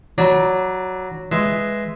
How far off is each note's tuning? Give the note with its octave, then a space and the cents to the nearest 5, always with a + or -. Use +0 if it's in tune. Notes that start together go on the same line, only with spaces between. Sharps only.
F#3 +0 D5 +0 B5 -45
G#3 +0 B4 +0 E5 +0